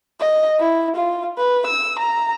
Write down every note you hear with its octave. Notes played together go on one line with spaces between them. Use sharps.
D#5
E4
F4
B4
E6
A#5